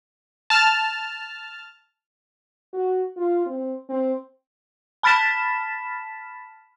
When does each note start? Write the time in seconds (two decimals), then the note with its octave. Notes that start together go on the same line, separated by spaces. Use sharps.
0.50 A5 F6
2.73 F#4
3.17 F4
3.46 C4
3.89 C4
5.03 A5 B5 F6 A6 B6 E7